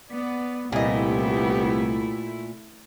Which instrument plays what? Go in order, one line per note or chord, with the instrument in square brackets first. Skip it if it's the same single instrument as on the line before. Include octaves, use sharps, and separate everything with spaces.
[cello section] B3 [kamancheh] D5
[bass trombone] C2 [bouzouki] A#2 D#5 [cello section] A3 E4 [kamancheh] B3 G4